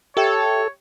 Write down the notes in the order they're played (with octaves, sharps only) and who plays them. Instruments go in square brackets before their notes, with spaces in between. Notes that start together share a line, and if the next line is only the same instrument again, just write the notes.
[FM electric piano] G4 E5 G5 [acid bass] A4 [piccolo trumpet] C#5